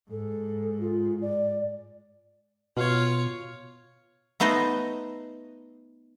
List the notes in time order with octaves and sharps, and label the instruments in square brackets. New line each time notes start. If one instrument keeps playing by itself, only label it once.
[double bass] G#2 [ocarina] A4
[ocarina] F4
D5
[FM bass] B2 [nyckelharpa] F4 C#5
[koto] A3 B3 D#4 C5 D#5